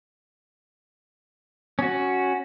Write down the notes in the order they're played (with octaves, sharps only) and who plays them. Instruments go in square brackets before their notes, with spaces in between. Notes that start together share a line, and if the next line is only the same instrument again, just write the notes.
[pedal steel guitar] C#4 F#4